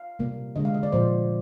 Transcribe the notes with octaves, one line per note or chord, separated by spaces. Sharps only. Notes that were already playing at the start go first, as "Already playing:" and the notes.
Already playing: F5
C3 G3 A#3
D3 G#3 D#5
F5
D#5
D5
A#2 F3 A#3 C5